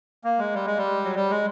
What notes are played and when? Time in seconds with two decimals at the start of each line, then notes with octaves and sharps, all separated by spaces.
0.24 A#3
0.39 G#3
0.54 G3
0.66 G#3
0.77 G3
1.04 F#3
1.15 G3
1.30 G#3